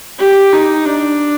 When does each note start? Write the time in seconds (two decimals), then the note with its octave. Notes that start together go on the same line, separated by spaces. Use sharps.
0.19 G4
0.53 D#4
0.86 D4